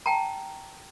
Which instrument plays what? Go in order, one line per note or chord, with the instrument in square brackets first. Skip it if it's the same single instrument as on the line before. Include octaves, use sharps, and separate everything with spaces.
[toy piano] G5 A5 A#5